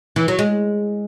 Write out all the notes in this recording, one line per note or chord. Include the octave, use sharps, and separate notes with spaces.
E3
F#3
G#3